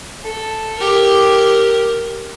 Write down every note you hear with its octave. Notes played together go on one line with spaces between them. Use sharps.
A4
G4 A#4